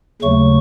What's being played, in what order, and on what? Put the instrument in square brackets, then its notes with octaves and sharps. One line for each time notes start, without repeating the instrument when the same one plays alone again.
[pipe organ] D#2 C#3 F#3 A3 C#6